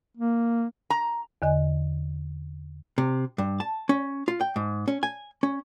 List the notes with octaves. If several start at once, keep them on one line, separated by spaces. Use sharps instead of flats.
A#3
A#5
E2 D3 D#5 G#5
C3
G2
A5
C#4
F4
G5
G#2
C#4
G#5
C#4